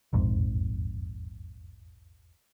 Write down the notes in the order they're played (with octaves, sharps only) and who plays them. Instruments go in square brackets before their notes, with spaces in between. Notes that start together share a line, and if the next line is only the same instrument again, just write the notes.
[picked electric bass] E1 A#1 F2 G#2